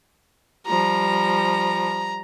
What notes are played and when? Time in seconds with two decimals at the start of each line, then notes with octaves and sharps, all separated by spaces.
0.67 F3 G3 A#5